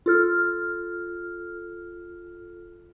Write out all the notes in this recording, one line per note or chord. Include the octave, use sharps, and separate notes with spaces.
F4 A4 F6